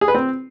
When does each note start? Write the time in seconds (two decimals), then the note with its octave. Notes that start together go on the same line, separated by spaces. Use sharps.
0.01 G#4
0.08 B4
0.15 C4